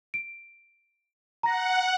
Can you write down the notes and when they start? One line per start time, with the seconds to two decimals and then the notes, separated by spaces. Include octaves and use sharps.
0.14 D7
1.43 F#5 A#5 A#6